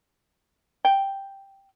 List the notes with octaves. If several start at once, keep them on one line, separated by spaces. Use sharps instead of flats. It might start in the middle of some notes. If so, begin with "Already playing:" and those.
G5